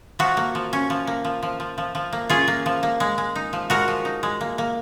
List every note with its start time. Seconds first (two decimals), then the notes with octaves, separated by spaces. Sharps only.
0.19 F3 F#4
0.37 A#3
0.55 F3
0.73 C#4
0.90 F3
1.07 A#3
1.25 F3
1.43 F3
1.60 F3
1.78 F3
1.95 F3
2.13 A#3
2.29 C#4 F4 G#4
2.48 A#3
2.66 F3
2.83 A#3
3.00 G#3
3.18 G#3
3.36 D#4
3.53 F3
3.70 G#3 F#4 A#4
3.88 F3
4.05 D#4
4.23 G#3
4.41 A#3
4.58 A#3